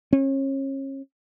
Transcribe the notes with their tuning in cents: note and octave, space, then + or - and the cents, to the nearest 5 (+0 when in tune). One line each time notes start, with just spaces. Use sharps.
C#4 -35